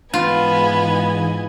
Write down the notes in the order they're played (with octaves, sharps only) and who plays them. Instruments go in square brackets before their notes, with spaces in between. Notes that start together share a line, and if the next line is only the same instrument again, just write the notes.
[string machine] G#2 E3 D#5 [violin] B3 G#5 [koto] F4